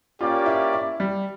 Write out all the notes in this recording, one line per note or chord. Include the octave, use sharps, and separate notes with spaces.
A#3 C#4 F4 G4 D5
E4
E4
G3